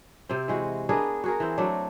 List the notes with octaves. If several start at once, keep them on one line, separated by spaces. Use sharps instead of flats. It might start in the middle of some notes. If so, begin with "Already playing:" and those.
C3 C4
E3 G#3 F#4
B3 D4 G#4 A#4
F#4 G#4 A#4
E3 C4
F#3 A3 D4